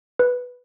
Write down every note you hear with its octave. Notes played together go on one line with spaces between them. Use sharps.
B4